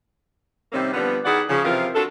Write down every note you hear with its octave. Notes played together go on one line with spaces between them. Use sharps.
C3 D#3 G3 A#3 C4 C#4
D3 F3 G3 B3
D#3 E4 G#4 D5 F#5
C#3 F3
C3 E3 F3 F4 A#4
D4 F4 F#4 A4